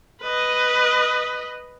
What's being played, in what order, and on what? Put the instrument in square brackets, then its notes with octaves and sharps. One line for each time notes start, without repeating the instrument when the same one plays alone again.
[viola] B4 D#5